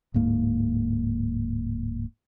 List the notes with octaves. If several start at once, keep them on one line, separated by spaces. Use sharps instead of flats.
D1 G#2 A#3